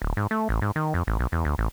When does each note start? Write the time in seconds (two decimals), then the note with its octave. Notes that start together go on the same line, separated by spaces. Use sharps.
0.02 D1
0.17 G#2
0.31 A3
0.49 A1
0.62 G#2
0.76 D#3
0.94 F2
1.07 A1
1.19 B1
1.32 E2
1.45 D2
1.58 A1